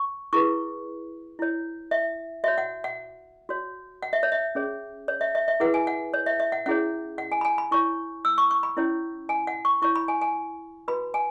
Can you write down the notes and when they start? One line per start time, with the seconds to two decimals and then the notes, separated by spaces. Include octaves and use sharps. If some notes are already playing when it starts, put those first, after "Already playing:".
Already playing: C#6
0.33 E4 G#4 B4 C#6
1.39 E4 C#5
1.91 E5
2.44 F#4 C#5 E5
2.58 F#5
2.84 F#5
3.49 F#4 C#5
4.03 F#5
4.13 E5
4.23 C#5
4.32 E5
4.55 C#4 G#4 C#5
5.08 C#5
5.21 E5
5.35 E5
5.48 E5
5.60 E4 G#4 B4 F#5
5.74 G#5
5.87 F#5
6.14 C#5
6.26 E5
6.40 E5
6.52 F#5
6.66 C#4 E4 G#4 C#5 F#5
7.18 F#5
7.32 G#5
7.41 B5
7.45 G#5
7.58 B5
7.71 E4 C#5 C#6
8.25 E6
8.38 C#6
8.51 C#6
8.63 B5
8.77 C#4 E4 C#5
9.29 G#5
9.47 F#5
9.65 C#6
9.82 E4 C#5 C#6
9.96 B5
10.08 G#5
10.22 G#5
10.88 F#4 B4 B5
11.14 G#5